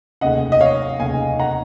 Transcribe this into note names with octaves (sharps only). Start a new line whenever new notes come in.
F1 D#2 C#3 D#5 F#5
D#5
C#5 F5
F1 D#2 C#3 F5 G#5
F#5 A#5